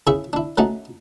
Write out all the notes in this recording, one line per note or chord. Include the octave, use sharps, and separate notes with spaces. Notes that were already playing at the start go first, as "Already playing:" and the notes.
C#3 E4 G#4 E5 C#6
D4 E4
F#3 A3 C#4 D#4 F#4